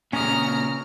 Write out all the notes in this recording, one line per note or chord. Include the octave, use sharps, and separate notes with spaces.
A#2 C#3 C#4 A#5 D#6 F6